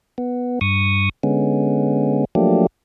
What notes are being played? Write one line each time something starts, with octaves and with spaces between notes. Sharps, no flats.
B3
G2 C#6 D#6
D3 G#3 B3 C#4
F3 F#3 A3 A#3 D4 G4